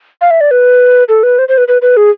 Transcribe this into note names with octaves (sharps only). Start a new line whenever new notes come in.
F5
E5
D5
B4
A4
B4
C5
C5
B4
B4
B4
G#4